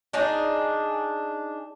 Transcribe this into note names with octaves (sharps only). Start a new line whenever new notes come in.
D4 D#4 G#4